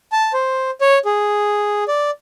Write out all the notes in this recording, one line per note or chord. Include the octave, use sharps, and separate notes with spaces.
A5
C5
C#5
G#4
D5